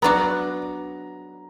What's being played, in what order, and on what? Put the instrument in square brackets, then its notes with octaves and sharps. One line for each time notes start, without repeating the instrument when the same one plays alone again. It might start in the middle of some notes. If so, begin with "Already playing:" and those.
[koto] F#3 B3 D4 F#4 [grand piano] A#5